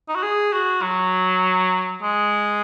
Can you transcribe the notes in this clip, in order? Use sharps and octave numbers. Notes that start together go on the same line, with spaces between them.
D#4
F#4
G#4
F#4
F#3
G#3